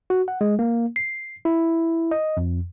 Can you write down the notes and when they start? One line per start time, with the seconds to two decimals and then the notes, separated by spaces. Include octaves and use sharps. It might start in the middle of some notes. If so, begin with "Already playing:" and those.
0.10 F#4
0.28 F#5
0.41 G#3
0.59 A#3
0.96 C7
1.45 E4
2.11 D#5
2.37 F2